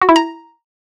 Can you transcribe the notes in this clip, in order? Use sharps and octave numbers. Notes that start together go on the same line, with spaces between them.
F#4
E4
A#5